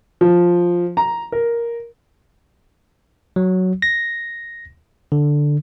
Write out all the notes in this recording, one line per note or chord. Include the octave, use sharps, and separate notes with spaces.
F3
A#5
A#4
F#3
A#6
D3